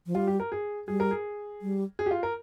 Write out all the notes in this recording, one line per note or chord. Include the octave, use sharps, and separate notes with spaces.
F3
G3 F4
G4
A#4
G#4
G3 G#4
A#4
G#4
G3
G#4
G4
F4
A#4